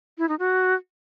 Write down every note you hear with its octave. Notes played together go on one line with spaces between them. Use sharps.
E4
D#4
F#4